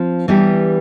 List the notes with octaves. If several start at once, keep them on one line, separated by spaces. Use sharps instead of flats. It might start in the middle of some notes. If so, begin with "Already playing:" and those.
Already playing: F3 C4 F4
E3 G3 B3 D4 G4